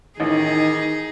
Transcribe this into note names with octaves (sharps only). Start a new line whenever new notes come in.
A1 D#3 D#4 G#4